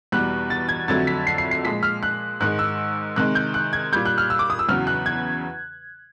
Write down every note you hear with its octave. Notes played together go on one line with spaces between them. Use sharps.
E2 B2 G3 F#6
A6
G#6
F2 D3 F#3 A3 A6
B6
C7
C7
C7
A#2 F3 G#3 B6
F6
F#6
G#2 D#3 G#3 F#6
E6
C3 D#3 G#3 F#6
G6
F#6
G#6
A#2 G3 G6
F#6
F6
E6
D6
D#6
E6
E2 C#3 F#3 F6
F#6
G#6